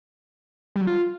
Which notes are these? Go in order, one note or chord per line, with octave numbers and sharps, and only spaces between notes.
G3
F#3
F4